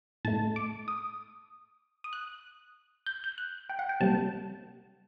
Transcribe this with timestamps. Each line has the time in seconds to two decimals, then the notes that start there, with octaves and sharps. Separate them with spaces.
0.25 A2 A3 A5
0.56 D6
0.88 D#6
2.04 D#6
2.13 F#6
3.06 G6
3.24 G6
3.38 F#6
3.69 G5
3.79 F#5
3.89 G5
4.00 C3 G3 A#3 A5